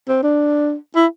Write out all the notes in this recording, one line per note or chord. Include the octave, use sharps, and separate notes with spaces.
C4
D4
E4